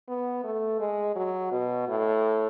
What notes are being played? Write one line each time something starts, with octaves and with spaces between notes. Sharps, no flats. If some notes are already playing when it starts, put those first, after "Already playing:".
B3
A3
G#3
F#3
B2
A2